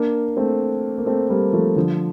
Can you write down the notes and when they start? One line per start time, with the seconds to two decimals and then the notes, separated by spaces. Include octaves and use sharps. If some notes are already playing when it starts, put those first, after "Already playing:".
Already playing: A#3 D4
0.37 A3 C4
0.98 A#3
1.06 A3 C4
1.30 G3 A#3
1.53 F3 A3
1.76 D3 F3